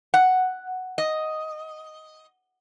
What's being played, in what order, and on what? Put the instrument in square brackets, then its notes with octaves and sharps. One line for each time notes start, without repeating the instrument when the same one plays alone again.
[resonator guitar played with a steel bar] F#5
D#5